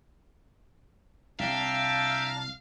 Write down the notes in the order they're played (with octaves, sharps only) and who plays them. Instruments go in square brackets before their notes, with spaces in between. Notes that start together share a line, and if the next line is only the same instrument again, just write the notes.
[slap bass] C2 [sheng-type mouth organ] D4 A5 A#5 [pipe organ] E5 G5 [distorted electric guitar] F5